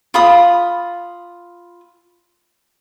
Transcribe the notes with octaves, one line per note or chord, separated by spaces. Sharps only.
F4 B5 D#6